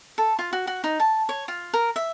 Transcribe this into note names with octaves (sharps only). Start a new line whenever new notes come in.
A4
F4
F#4
F#4
D#4
A5
C#5
F4
A#4
E5